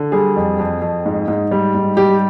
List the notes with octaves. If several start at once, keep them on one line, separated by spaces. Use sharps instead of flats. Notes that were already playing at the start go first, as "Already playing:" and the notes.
Already playing: D3
G3 G#4
F2
F2
F2
G#2
G#2
G3
G#2
G3 G4